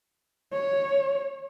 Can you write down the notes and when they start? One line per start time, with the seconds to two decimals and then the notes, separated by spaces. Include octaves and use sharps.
0.53 C#5